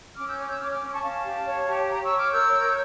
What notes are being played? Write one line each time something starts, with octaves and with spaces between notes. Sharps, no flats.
C#4 D6 F6
E6 G6
C#5 D6 F6
E6 G6
C#4 D6 F6
D6 F6
C#4
D6
A5 C#6
C#4 F5 A5
G4
C#5
G4
C#5 G5 A#5
C#6 E6
C#5
D6 F6
A#4 E6 G6
C#5